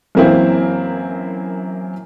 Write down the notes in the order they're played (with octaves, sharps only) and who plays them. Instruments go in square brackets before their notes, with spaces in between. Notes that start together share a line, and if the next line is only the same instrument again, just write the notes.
[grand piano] F#2 E3 A#3 C4 E4